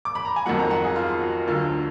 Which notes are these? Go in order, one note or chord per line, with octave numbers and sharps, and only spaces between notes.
D6
B5
A#5
G#5
F2 D#3 F#3 F#5
A#5
F#5
G#4
F4
F#4
D2 D3 F#3 F4